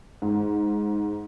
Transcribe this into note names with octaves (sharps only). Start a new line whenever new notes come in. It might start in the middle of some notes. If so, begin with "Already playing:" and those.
G#2